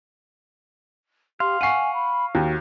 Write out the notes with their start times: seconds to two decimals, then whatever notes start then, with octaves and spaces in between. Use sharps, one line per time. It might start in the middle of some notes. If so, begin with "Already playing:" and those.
1.40 G4 F5 C6
1.61 F#5 G#5 C#6 C7 D#7
1.94 B5
2.35 D#2 F#4